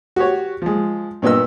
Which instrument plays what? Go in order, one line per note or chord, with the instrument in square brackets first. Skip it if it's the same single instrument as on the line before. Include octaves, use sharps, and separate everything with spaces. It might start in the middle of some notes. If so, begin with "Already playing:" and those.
[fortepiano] F#4 G4 C#5
F3 G#3
G2 A#2 B3 D#5 E6